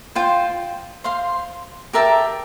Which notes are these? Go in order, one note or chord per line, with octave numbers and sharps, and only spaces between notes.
F4 C5 G5
C5 F5 C6
G4 A#4 E5 A5